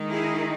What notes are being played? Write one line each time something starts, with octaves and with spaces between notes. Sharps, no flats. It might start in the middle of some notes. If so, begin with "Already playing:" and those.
Already playing: D#3 G#3 D#4
E4 G#4